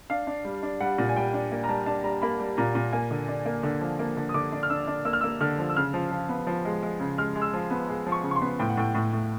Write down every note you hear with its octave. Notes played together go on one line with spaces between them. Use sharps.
D4 F5
D4
G3
D4
G3 F#5
A#2
G#5
G3 G5
D4
A#3
A#5
G3 A5
D4 A5
G3 A#5
A#3 B5
G3
A#2 A#5
A#2
A#3 G#5
D3
D4
A#3
D3
F3
A#3
D3
D#6
D3 D6
D4
F6
D4 E6
D4
A#3 E6
F6
A#3 E6
D3 F6
F3
E6
C#3 F6
F3
F3
B3
F3
G#3
G#3
C#3
G#3 F6
G#3
E6
F3
B3
G#3
F3
C#6
C#3
C#6
C6
B3
A2 G5
F#5
A2 G5
A2
A2